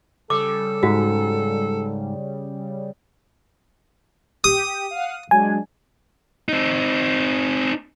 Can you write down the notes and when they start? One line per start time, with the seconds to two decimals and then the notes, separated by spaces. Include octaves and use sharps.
0.30 C#3 G3 A4 D6
0.83 G#2 F#4
4.44 G4 D#6
4.91 F5 F#5
5.31 F#3 G#3 D4 G#5
6.49 C4 D#4